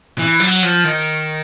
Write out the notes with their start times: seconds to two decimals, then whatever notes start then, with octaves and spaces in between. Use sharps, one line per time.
0.18 E3
0.40 F#3
0.62 F3
0.84 D#3